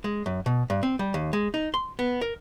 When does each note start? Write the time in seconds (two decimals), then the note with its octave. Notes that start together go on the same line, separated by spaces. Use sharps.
0.04 G#3
0.26 F#2
0.46 B2
0.70 G2
0.83 C4
0.99 G3
1.14 D#2
1.33 G#3
1.54 D#4
1.74 C6
1.99 B3
2.21 A#4